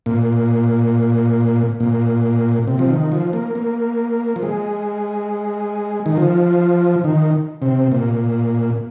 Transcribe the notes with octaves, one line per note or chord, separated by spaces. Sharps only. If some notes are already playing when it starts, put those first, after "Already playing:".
A#2
A#2
C3
F3
D#3
F3
A#3
A#3
F3
G#3
D#3
F3
D#3
C3
A#2